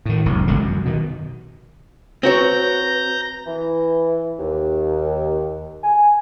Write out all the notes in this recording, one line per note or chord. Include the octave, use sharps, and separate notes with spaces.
A2 D#3
E1 B1 C3
G1 C#2 D3
F#2
B2 D#3
C4 F#4 B4 C#5 A#5 G6 A#6
E3
D#2
G#5